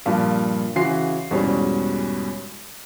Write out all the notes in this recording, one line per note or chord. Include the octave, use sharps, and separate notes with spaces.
G2 A#2 F3
C#3 E3 F#4 C6 C7
E2 G#2 B2 G3 C#4